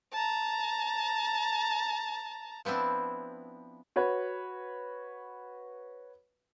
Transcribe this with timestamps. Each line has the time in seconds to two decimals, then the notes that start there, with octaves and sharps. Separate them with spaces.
0.13 A5 A#5
2.65 F3 B3 C4 D4 E4
3.96 F#4 B4 C#5